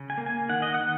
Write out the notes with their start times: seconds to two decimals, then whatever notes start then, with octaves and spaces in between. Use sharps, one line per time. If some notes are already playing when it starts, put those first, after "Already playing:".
Already playing: C#3 C#4
0.10 G#5
0.17 A#3
0.26 G#5
0.49 D#3 F#5
0.62 D#5
0.74 F#5
0.80 D#3